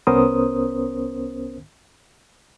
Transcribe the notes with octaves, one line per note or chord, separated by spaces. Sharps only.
C2 B3 C#4 A#4 C5 D#6